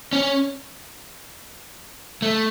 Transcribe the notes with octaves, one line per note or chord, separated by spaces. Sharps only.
C#4
A3